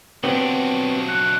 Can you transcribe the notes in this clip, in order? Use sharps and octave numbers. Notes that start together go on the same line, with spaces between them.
F#3 B3 C4 D4 G4
F#6 C#7